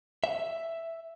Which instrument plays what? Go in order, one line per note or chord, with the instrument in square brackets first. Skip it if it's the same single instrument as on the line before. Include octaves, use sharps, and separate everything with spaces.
[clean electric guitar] E5